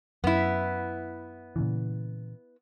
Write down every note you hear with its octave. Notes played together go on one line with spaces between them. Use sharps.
F#2 B3 E4
A#2 C#3 E3